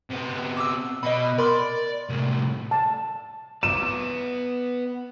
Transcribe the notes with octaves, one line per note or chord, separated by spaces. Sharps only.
C3 B3
D6 E6
B2 D#5 B5
A#4 D5 B5 C6
C2 A2
A5
B3 D5 E7